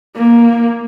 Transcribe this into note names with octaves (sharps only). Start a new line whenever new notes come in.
A#3